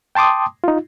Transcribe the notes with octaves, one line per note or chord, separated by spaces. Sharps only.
G5 A5 C6 D6 D#6
D#4 F4